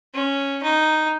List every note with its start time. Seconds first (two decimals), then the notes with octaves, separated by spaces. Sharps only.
0.14 C#4
0.63 D#4